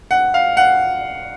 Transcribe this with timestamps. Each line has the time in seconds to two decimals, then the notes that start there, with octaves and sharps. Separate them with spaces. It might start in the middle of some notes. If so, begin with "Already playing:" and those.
0.11 F#5
0.34 F5
0.57 F#5